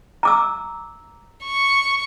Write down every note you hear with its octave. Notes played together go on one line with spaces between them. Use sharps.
A#5 D6 E6
C#6